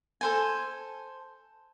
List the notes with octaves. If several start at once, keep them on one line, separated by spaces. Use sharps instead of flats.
A4 C5 G#5